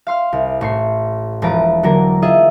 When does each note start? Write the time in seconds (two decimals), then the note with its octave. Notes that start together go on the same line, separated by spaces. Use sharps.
0.07 F5 C6 F6
0.33 C2
0.61 A1 C#6 C7
1.42 E1 F3 B4 A#5 D7
1.83 D3 F#3 A#3 A#4
2.22 F4 G#4 D#5 E5